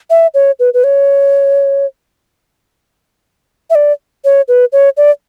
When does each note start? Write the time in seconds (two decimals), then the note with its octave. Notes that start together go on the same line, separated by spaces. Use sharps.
0.10 E5
0.34 C#5
0.60 B4
0.74 B4
0.84 C#5
3.70 E5
3.75 D5
4.25 C#5
4.48 B4
4.72 C#5
4.97 D5